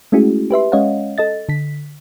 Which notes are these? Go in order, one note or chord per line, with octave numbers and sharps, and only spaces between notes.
G#3 A3 C#4 E4 F#4 G#4
G4 B4 E5 C6
G#3 C#4 C#5 D#5 F5 F#5
A4 D#5 A6
D3 B6